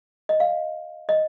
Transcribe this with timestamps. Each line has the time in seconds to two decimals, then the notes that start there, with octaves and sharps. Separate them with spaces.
0.29 D#5
0.40 F5
1.09 D#5